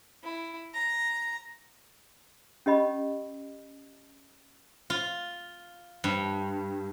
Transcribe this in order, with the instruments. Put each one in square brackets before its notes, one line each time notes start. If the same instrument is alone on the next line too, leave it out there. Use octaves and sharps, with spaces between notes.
[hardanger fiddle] E4
A#5
[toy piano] C#4 G4 D#5 B5
[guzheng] F4
G2